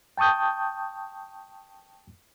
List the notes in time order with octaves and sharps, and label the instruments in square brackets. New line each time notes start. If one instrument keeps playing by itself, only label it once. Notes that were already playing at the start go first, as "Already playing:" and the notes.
[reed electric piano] G5 A5 C#6 D#6 G6